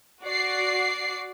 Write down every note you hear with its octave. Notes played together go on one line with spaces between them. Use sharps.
F#4 D5 C7